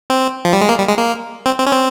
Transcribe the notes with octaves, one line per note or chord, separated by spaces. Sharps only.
C4
F3
G3
G#3
A#3
G3
G#3
A#3
C4
C4
C#4
C4